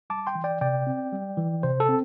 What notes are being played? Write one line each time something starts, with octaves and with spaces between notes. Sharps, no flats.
G3 A5 D6
G5 C6
E3
D5 G5
C3 D5 G5
C4
G3
E3
C3 C5
A4
C4